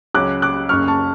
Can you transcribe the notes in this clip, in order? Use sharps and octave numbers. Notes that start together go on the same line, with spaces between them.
C#2 C#3 F#3 C#4 D6 F#6
D6 F#6
F#1 F#2 C#3 C#6 F6
A5 C#6